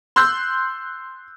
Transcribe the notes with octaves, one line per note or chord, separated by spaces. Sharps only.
C6 E6 F#6 G6